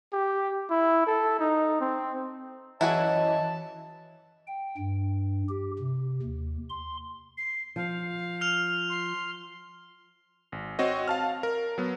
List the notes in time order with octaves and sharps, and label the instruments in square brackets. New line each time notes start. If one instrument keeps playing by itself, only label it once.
[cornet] G4
E4
A4
D#4
C4
[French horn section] F#2 C#5 D#5 [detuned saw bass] E3 [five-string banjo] E4 F#4 G#4 [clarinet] A5
[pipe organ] G5
G2
G4
C3
D#2
C6
[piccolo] C7
[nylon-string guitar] F3 [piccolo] F5
[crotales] F6 F7
[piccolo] C6
[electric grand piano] G#1
C4 F#4 C#5 D#5
F5 A5 F6
A#4
F#3 B3